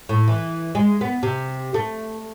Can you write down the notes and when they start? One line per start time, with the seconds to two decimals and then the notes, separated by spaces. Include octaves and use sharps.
0.09 A2
0.28 E3
0.75 G#3
1.01 B3
1.23 C3
1.74 A3